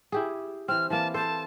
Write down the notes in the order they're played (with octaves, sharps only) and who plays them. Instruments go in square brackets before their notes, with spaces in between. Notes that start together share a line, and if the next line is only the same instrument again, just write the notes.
[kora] E4 G4 G#4
[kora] E3 C4 [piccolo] F6
[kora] E3 A#3 [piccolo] A5
[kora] A4 C5 [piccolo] A5